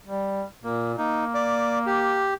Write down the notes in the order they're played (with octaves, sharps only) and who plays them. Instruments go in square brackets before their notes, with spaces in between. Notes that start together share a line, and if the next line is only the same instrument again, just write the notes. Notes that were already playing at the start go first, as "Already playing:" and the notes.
[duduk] G3
[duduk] A#2 [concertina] A#3
[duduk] A#3 [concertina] D#4
[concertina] D5
G4